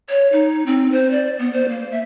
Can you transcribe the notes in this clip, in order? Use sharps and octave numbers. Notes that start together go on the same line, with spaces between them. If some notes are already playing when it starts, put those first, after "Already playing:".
C#5
D#4
C4
C5
D5
B3
C5
A#3
E5